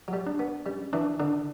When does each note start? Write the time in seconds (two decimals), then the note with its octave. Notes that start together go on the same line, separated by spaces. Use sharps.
0.08 F#3
0.13 G3
0.26 D4
0.39 B3
0.66 G3 C#4
0.93 E3 D4
1.20 D3 D4